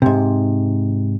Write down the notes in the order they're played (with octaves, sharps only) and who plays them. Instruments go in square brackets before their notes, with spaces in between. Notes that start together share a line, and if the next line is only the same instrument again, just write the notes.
[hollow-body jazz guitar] G#2 C3